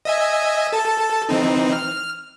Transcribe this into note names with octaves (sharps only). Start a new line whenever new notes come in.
D#5 E5 G#5
A4 A5
E3 C4 D#4
F6